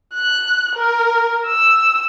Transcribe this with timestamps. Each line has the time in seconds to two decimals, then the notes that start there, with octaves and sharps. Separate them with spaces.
0.14 F#6
0.75 A#4
1.47 E6